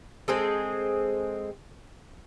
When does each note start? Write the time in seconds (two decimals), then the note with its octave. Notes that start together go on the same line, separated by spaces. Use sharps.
0.28 G#3 C4 G#4 A4